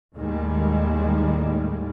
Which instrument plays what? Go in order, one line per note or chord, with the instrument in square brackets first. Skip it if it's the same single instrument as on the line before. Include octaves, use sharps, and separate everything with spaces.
[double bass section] D#2 A2 D#3 G3 G#3